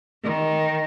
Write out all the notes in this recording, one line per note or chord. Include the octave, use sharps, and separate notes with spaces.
D#3